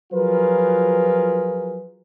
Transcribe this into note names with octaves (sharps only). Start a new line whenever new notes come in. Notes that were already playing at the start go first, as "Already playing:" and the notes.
F3 F#3 F4 G#4 A#4 B4